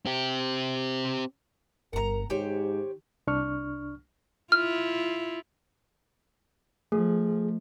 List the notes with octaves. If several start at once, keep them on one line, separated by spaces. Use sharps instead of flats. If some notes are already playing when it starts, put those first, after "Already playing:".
C4 G4
G1 G2 A#4 F#5 A#5
G#2 D#3 G4 C5 C#5
C2 D4 C#6 F6
E4 F4 F6
F3 A3 G#4